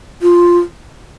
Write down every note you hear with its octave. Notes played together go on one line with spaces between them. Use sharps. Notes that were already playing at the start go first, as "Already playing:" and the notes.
F4